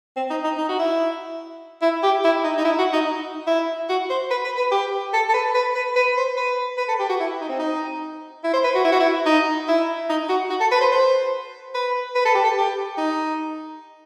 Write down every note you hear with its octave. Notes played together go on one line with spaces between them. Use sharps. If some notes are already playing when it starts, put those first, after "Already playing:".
C4
D#4
D#4
D#4
F#4
E4
E4
G4
E4
D#4
D#4
E4
F#4
D#4
E4
F#4
C5
B4
B4
B4
G4
A4
A4
B4
B4
B4
B4
C5
B4
B4
A4
G4
F#4
E4
D#4
C4
D#4
E4
C5
B4
F#4
E4
F#4
E4
D#4
E4
D#4
F#4
F#4
A4
B4
C5
C5
B4
B4
A4
G4
A4
G4
D#4